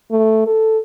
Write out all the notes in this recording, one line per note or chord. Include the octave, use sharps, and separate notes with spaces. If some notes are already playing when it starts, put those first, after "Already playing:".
A3
A4